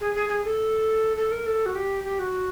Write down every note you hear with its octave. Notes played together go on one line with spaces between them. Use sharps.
G#4
G#4
G#4
A4
A4
A#4
A4
F#4
G4
G4
F#4